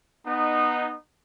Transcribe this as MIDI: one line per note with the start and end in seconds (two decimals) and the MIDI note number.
0.25 0.93 59
0.25 0.93 63